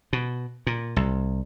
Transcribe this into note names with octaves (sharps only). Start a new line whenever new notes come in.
B2
A#2
C2